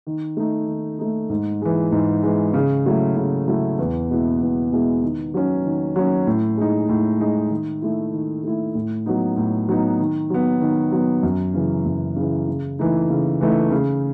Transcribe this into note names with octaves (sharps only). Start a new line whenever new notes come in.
D#3
A3 D#4
D#3
A3 D#4
G#2
E3 G#3
G#2
E3 G#3
C#3
F#3 A3 E4
C#3
F#3 A3 E4
E2
B2 G#3 B3 E4
E2
B2 G#3 B3 E4
D#3
F#3 C#4
D#3
F#3 C#4
A2
G#3 D#4
A2
G#3 D#4
D#3
A3 E4
D#3
A3 E4
A2
F#3 B3 D#4
A2
F#3 B3 D#4
D#3
F#3 B3
D#3
F#3 B3
F#2
C#3 E3
F#2
C#3 E3
C#3
E3 A3 D#4
C#3
E3 A3 D#4
C#3